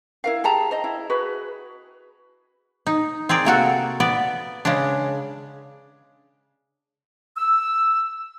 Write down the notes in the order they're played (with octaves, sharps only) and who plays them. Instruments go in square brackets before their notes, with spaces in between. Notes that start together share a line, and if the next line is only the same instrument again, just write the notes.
[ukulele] E4 A#4 F5
G4 G#4 A5 A#5
C5 D#5
E4
F#4 G#4 B4
[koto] D#4
C4 G#4 A#4 D5
C3 A#3 F#4 A4
B3 B4 D5
C#3 G#3 C#4 D4
[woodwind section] E6